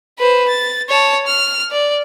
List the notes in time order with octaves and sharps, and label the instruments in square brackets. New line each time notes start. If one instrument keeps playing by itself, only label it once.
[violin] B4 C5
A6
C#5 A5
F6
D5